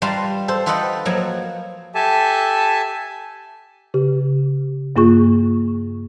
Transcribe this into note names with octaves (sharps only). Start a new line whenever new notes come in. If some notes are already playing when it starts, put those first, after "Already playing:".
G3 F4 B4 A5 A#5 C6
A4 C5
F4 A4 B4 D#5 F#5 G5
F3 F#3 A#3
G4 A4 E5 G#5 A5
C#3 G4
G2 A#3 F4 G#4 C#6